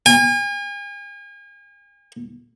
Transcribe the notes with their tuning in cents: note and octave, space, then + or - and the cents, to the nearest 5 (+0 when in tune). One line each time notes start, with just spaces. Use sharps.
G#5 -40